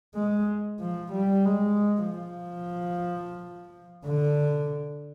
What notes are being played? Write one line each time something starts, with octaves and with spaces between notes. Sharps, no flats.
G#3
F3
G3
G#3
F3
D3